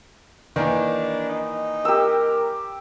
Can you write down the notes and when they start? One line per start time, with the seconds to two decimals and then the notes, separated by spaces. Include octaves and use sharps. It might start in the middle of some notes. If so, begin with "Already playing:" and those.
0.56 D#3 E3 A#3 D4
1.29 D#4
1.85 G4 A#4 E6